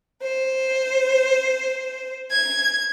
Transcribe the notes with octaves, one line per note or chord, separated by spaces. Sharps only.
C5
G#6